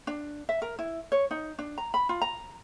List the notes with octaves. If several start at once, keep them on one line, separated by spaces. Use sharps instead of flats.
D4
E5
A#4
E4
C#5
D#4
D4
A#5
B5
F4
A#5